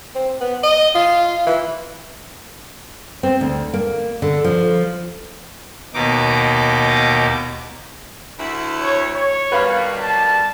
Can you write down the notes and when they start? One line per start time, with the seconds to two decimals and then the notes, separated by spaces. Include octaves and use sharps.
0.15 C4
0.41 B3
0.63 D#5
0.95 F4
1.47 E3
3.23 C4
3.41 D2
3.74 A#3
4.22 D3
4.44 F3
5.94 D#2 B2 D#4 D6
8.40 D2 E4
8.82 C#5
9.15 C#5
9.52 B2 D#3 G3 B4 F5 B5
10.01 A5